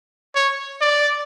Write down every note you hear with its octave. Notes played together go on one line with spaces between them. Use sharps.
C#5
D5